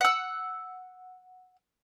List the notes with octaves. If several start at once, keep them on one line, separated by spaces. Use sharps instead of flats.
F#5 E6